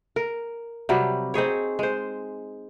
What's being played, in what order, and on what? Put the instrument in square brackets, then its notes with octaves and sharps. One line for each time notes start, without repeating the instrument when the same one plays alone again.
[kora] A#4
C3 F#3 G3
C4 D#4 G#4 C#5
G#3 C5